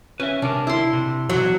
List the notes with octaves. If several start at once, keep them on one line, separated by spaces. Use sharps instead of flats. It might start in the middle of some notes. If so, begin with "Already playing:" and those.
C#4 B4 E5
C3 D4 A#4
E4 C6
C3
E2 F#3